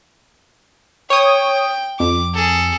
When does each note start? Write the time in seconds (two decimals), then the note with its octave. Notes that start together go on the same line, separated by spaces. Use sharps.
1.10 C#5 G5 D#6
2.00 F2 D6
2.34 G#4 A4